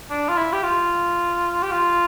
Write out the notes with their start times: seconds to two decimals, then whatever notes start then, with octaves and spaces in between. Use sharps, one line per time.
0.10 D4
0.29 F4
0.37 E4
0.53 G4
0.64 F4
1.63 G4
1.72 F4